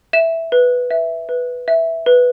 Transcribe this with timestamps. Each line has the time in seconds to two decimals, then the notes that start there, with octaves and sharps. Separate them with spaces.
0.13 E5 E7
0.52 B4
0.91 E5
1.29 B4
1.68 E5
2.06 B4